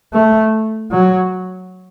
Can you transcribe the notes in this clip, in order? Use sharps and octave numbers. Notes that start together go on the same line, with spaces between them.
A3
F#3